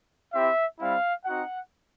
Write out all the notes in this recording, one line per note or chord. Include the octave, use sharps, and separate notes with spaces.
C4 E4 G4 E5
G3 C4 E4 F5
C4 D#4 F#4 F#5